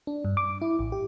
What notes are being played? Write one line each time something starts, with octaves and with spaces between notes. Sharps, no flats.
D4
G2
D6
E4
A1
G4